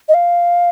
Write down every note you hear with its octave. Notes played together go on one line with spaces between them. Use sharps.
D#5
F5